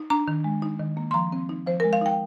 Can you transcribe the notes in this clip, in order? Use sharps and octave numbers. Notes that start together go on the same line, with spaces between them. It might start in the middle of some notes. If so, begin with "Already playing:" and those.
Already playing: D#4
D4 A#5
D#3
G#3
D#4
D#3
A#3
C6
F3 A#5
C4
D#4
F3 C5
A#4
G#3
F5
D#4 G5